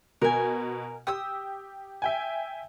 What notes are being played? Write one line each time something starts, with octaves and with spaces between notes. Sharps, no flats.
B2 A#4 G#5
G4 D#6 E6
E5 G5 G#5